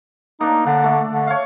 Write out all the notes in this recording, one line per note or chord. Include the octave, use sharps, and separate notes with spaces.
A#3 D4 D#4
D3 D4
A3
D3
C#5 F5